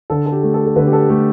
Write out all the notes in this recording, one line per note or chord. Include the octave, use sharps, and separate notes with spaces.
D3 A4
A4
G4
A3
A4
A4
D3 B4
G4
A4
A3 G4